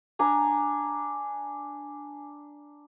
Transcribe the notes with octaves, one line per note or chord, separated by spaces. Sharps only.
D4 G#5 A#5